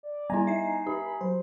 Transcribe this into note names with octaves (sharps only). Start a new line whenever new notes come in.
D5
G3 E4 G#5 A#5
D#4 E5 C7
G4 B5
F#3 C5